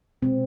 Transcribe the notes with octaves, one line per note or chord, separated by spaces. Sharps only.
B2 G#3 C4